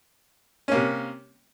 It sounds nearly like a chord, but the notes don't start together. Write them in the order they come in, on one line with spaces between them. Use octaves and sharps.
C#4 A#3 C3